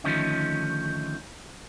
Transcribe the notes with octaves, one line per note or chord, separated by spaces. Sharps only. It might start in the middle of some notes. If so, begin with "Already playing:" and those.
D3 D#3 F3 A3 C#4 D#4